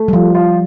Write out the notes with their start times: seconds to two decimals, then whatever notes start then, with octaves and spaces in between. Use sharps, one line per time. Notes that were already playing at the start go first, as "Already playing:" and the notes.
Already playing: A3
0.08 G3
0.13 F3 F4
0.34 F4